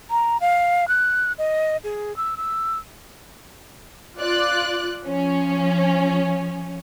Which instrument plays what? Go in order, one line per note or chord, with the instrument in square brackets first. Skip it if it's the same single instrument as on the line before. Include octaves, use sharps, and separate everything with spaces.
[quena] A#5
F5
F#6
D#5
G#4
E6
E6
[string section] F4 D5 F#6
F3 C#4